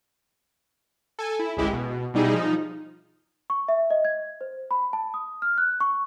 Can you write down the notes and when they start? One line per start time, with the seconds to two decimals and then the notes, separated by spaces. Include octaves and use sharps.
1.19 A4 G#5
1.39 E4
1.57 G#1 C#2 G#3 E4 G4
1.73 B2
2.14 B2 G3 D#4 E4 G#4
2.34 F3 D#4
3.50 C#6
3.68 E5
3.90 D#5
4.05 G#6
4.41 C5
4.71 B5
4.93 A5
5.14 D#6
5.42 F6
5.58 F#6
5.80 C#6